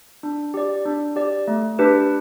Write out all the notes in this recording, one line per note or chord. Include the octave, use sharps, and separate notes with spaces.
D4
G4 D5
D4
G4 D5
A3
D4 G4 B4